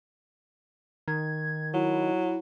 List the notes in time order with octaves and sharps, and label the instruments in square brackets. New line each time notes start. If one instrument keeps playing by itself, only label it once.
[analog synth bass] D#3 [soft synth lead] G#6
[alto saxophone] F#3 [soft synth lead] E4